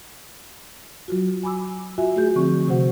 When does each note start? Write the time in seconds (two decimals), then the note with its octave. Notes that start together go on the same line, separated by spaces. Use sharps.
1.08 F#3 F4 F#4
1.43 G#5 B5 D6 E6
1.98 F4 F#4 E5 G#5
2.16 A3 F#4 G#4 G6
2.36 D3 F3 C4 C#6
2.68 C3 F#4 C5 F#5